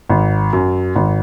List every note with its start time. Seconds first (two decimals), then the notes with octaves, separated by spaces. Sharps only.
0.09 G#1
0.53 F#2
0.95 G#1